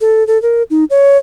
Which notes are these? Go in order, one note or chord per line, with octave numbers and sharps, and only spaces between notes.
A4
A4
A#4
D#4
C#5